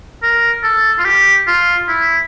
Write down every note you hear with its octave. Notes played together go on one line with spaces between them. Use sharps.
A#4
A4
F4
G4
F4
E4